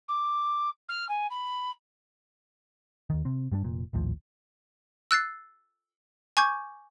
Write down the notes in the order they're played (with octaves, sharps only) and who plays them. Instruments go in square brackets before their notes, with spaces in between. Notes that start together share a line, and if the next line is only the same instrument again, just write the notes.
[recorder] D6
F6
G#5
B5
[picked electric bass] D#2 D#3
C3 C4
G2 G3 A3 D4
F1 A#2
A#1 D#2 A2 F3
[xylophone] E6 F#6 A6 C7
G#5 C#6 D6 G6 G#6